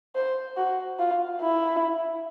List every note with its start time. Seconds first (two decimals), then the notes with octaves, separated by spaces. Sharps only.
0.15 C5
0.57 F#4
0.99 F4
1.42 E4